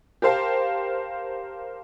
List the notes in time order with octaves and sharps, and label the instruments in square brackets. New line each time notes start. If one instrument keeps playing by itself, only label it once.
[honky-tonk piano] G4 A#4 C5 F5 A5